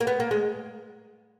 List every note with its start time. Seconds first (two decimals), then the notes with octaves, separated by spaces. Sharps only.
0.01 A#3
0.07 B3
0.20 A#3
0.31 G#3